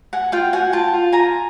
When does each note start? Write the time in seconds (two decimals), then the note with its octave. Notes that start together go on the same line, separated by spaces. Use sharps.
0.13 F#5 G#5
0.32 F4 F5 G5
0.53 F#4 F#5 G#5
0.73 F4 G5 A5
0.92 F4
1.12 G#5 A#5